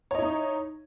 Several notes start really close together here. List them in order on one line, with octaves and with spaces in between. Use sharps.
C#5 D#5 E4 D#4